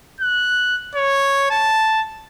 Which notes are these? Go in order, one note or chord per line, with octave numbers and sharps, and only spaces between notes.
F#6
C#5
A5